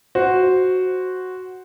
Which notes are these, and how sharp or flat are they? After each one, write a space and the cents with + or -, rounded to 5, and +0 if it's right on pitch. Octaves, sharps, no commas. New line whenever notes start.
F#4 +0 C5 +0